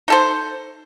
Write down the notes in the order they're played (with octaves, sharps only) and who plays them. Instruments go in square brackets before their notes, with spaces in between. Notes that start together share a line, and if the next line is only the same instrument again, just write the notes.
[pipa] D#4 A4 C5